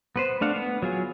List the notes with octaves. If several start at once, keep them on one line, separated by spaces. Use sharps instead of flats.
B3 B4 C5
A3 D4 F5 F#5
B3
F#3 F4 G#4